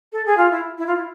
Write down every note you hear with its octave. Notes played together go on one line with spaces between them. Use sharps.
A4
G#4
F4
E4
E4
F4
E4